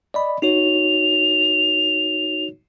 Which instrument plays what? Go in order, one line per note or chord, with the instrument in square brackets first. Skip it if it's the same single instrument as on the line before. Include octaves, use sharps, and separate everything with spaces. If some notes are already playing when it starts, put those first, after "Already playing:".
[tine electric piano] D5 D#5 B5
[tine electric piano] D#4 F#4 C#5 [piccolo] F7